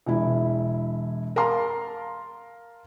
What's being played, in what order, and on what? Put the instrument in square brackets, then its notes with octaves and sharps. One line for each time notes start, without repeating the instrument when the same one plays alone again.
[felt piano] E1 E3 E4
A#4 F5 A5 A#5 C6